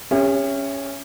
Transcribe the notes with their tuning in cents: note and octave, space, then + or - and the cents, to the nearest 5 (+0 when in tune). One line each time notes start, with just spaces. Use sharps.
C#4 +0 G4 +45 E5 +15